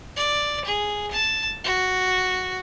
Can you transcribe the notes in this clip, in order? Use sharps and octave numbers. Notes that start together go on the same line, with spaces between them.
D5
G#4
A5
F#4